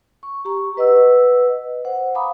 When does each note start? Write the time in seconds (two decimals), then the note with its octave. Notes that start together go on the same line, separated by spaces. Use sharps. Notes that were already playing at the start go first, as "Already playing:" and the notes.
0.23 C#6
0.45 G4 A#5 C#6
0.77 B4 D#5 F#5 E6
1.85 C5 F#5
2.15 F5 G#5 A#5 B5 D6 D#6